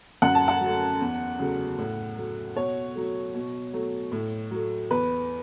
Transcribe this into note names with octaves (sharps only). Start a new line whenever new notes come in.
F#2 F#5
A5
F#5
F#3 A3
E2
C#3 F#3 A3
A2
F#3 A3
B2 C#5
F#3 A3
B2
F#3 A3
A2
F#3 A3
E2 B4